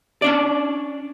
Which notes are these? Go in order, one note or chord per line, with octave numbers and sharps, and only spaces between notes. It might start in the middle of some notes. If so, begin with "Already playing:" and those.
C#4 D4 D5